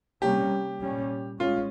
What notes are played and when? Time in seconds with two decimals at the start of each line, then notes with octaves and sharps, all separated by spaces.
0.22 C3 G3 A#3 C#4 G4
0.81 A#2 G3 C#4
1.40 G#3 C#4 F4